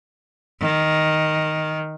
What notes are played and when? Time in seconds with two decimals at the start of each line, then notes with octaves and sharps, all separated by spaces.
0.60 D#3